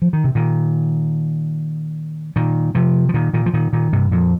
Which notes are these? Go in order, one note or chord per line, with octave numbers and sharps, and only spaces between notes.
F3
D#3
C3
A#2 D#3
A#2 D#3
C3 F3
F3
A#2 D#3
A#2 D#3
F3
A#2 D#3
A#2 D#3
G2 C3
F2 A#2